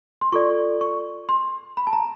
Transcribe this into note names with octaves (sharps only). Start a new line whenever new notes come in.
C6
F4 A4 D5 C#6
C#6
C6
B5
A5
A#5